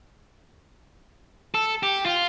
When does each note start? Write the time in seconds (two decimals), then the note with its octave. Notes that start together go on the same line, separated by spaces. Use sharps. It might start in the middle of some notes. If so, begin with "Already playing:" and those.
1.54 A4
1.83 G4
2.06 F4